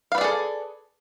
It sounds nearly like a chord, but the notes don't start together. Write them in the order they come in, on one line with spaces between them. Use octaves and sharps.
F5 B4 D5 G#4 A4